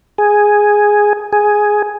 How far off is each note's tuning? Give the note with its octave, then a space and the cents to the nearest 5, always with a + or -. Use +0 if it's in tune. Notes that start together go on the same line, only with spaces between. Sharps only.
G#4 +0
G#4 +5